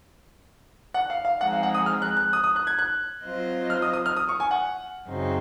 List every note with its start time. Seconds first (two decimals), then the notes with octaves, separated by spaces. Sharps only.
0.94 F#5
1.10 F5
1.25 F5
1.40 F3 G#3 C4 D#4 G#4 F#5
1.53 F5
1.63 F#5
1.75 D#6
1.86 F6
2.02 F#6
2.17 F#6
2.33 D#6
2.44 D#6
2.56 F#6
2.67 G#6
2.79 F#6
3.25 F#3 C4 F4 C5 D#5
3.70 F6
3.82 D#6
3.93 D#6
4.06 F6
4.17 D#6
4.29 C#6
4.40 G#5
4.51 F#5
5.08 F#2 C#3 F#3 C4 D#4